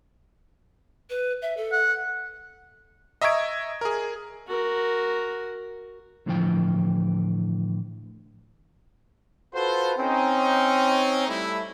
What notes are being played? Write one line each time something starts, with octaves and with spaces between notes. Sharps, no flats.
B4
E5
A4
F#5
D#5 E5 A#5 C#6 G#6 D7
G#4 A#4
F#4 A#4
E2 A2 D3 E3 F3 G5
F4 F#4 A4 B4 C5
C4 C#4 D#4
G3 A3 E4